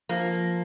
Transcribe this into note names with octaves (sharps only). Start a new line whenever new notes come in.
F3 A#3